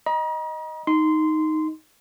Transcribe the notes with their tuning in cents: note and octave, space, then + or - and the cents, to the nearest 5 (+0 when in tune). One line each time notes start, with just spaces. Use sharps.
D#5 +0 A#5 +40
D#4 +5 C6 -15